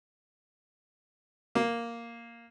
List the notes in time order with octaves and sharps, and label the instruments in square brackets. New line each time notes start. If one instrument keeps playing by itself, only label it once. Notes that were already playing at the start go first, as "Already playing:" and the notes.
[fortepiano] A#3